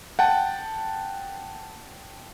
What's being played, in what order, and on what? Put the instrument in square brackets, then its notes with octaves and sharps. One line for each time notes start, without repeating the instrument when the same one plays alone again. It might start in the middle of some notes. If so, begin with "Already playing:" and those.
[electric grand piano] F#5 G5 A5